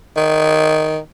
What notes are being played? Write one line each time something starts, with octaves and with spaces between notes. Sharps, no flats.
D#3